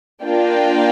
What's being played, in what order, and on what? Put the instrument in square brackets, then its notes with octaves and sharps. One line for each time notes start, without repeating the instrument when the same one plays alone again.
[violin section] A#3 D4 F4 D5 G5